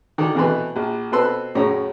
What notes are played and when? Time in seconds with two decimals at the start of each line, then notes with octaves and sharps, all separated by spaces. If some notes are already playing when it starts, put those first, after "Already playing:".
0.18 D3 D#3
0.35 F2 B2 E3 A3 B4 C6
0.76 A#1
1.12 B2 C4 A4 B4 C6 E6
1.55 F#2 A2 C#3 C#4 A#5